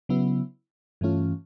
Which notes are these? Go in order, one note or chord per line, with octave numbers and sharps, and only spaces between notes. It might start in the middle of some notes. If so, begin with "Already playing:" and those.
C#3 F#3 B3 E4
G2 E3 A3 C#4 F4